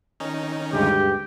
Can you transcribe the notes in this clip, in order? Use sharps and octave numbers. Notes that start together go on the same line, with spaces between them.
D#3 C#4 D#4
D2 G2 G#3 G4